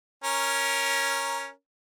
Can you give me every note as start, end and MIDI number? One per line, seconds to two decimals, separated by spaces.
0.24 1.50 61
0.24 1.50 70